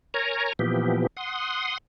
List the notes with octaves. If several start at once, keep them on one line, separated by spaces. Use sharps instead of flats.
A#4 C#5 G#5 A#5
A#2 E3 F3 B3 G4
F#5 C6 D#6